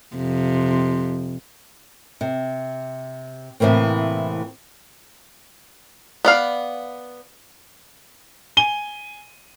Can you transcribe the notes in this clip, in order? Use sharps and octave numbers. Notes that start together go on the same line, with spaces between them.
F2 C3
C3
A2 C3 E3 A#3 C4
B3 D5 F5
G#5 D#7 G7